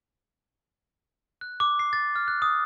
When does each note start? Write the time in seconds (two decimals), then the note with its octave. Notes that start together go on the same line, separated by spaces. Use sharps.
1.41 F#6
1.60 D6
1.79 C7
1.93 A6
2.16 F6
2.28 F#6
2.42 D#6